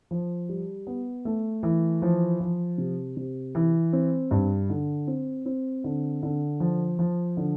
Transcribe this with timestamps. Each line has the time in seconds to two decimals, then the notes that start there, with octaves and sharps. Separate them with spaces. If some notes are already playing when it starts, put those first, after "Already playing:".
0.11 F3
0.49 G3
0.87 B3
1.25 A3
1.63 E3
2.02 F3
2.40 F3
2.78 C3
3.17 C3
3.55 E3
3.93 C4
4.31 G2
4.70 D3
5.07 C4
5.46 C4
5.84 D3
6.23 D3
6.60 F3
6.99 F3
7.37 D3